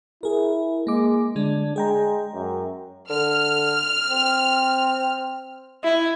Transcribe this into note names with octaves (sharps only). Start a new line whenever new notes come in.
E4 G#4 A#4
G#3 A#3 D6
D3 G#3 D4
G#3 G#4 G5 A#5
F#2
D3 F6
C4
E4